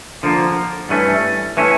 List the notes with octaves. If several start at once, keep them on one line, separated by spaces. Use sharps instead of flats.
D3 F3 A#3
G2 E3 A3 C#4
E3 A3 C#4